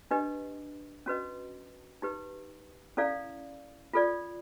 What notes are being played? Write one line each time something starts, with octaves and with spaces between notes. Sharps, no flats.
D4 G4 B4 D#5
C#4 F#4 B4 D#5
D#4 G4 B4
C#4 E4 A4 D5 F5
F4 A4 D5